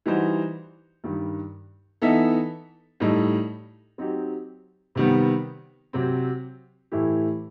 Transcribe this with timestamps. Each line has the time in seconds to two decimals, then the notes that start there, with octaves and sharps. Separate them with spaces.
0.06 E3 G3 D#4 F#4 C5
1.04 G2 D#3 G3
2.02 E3 B3 D#4 A4 E5
3.00 A2 G3 D#4 A4
3.98 F#3 C4 D#4 G4
4.95 C3 D#3 G3 B3
5.93 C3 F#3 C4
6.92 A2 E3 A3 E4 G4